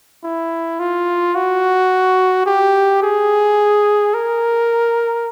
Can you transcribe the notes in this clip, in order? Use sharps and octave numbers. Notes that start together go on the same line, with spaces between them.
E4
F4
F#4
G4
G#4
A#4